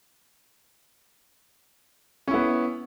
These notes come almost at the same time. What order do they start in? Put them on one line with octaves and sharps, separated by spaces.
C#4 E4 B3